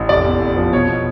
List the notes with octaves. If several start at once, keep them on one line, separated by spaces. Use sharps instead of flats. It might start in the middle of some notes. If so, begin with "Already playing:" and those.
Already playing: A1
F1 D5
E2
E2
F3
B2 C#5
B2